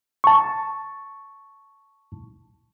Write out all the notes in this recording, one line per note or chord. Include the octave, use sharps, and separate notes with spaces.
A5 C#6